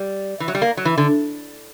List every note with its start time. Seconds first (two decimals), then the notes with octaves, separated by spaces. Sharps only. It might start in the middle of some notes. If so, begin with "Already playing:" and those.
Already playing: G3
0.40 E3
0.48 F#3
0.55 G3
0.62 A#3
0.77 F#3
0.85 E3
0.98 D3